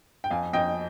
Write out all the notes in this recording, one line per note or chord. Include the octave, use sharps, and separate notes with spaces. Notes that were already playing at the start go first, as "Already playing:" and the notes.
G5
F2 F5 G#5
F2 D#5 G5